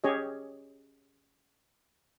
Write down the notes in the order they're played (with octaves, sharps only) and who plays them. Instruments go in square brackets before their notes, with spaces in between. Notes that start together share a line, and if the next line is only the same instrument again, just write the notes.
[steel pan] C#4 G4 G#4 C#5 D#5